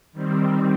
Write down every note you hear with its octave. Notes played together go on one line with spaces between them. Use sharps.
D#3 G3 C4